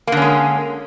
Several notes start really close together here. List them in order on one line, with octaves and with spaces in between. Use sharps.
A#3 D3 C#4 G#3